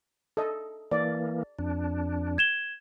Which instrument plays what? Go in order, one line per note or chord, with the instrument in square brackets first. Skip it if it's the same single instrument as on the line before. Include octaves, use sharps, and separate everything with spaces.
[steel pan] A4 D#5
[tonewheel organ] E3 A#3 [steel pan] D5
[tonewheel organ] F2 D4
[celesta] G#6 E7 G7